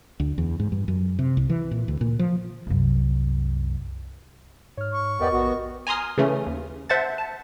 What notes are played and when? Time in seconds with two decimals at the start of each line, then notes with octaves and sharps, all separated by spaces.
0.20 D2
0.38 E2
0.60 G#2
0.72 G2
0.88 F#2
1.19 C3
1.37 C2
1.50 E3
1.71 A#2
1.88 D2
2.01 A#2
2.19 F3
2.67 C2 F#2
4.77 G#2 C#5 F6
4.92 C#6
5.20 E2 B3 G4 A#4 D5 D#5
5.32 A#1 B3 F#4
5.87 G#5 A#5 C6 D#6 F6
6.18 C#3 E3 A3 C#4
6.46 D#2
6.90 C5 E5 F#5 A5 A6
7.18 A5